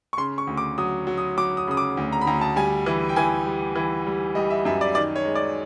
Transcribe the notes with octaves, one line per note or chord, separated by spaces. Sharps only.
C#6
C#3 C6
C#6
D2
D6
F#3 D#6
F#3
D#6
F#3 D6
D#6
C#3 D#6
D6
D2
A#5
B5
D2 A#5
A5
G3 G#5
E3
G5
E3 G#5
G3
E3
G3
G3 D#5
E5
F#2 E5
D5
D#3 D5
C#5
G#3
D5